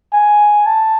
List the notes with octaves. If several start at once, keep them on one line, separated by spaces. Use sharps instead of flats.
G#5
A5